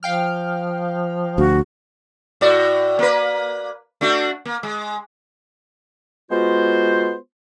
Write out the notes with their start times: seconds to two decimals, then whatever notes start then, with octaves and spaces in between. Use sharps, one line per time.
0.03 F3 F5 G5 F6
1.38 D2 F#4
2.41 A2 F#4 D5
2.99 A#3 B4
4.01 A3 D4 F#4
4.45 A#3
4.63 G#3
6.31 G#3 B3 F4 F#4 C5